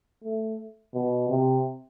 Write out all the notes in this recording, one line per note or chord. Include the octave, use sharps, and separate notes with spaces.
A3
B2
C3